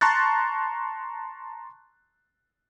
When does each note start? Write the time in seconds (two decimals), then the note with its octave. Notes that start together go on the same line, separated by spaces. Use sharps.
0.01 A5 A#5 C6 C#6 F#6 A6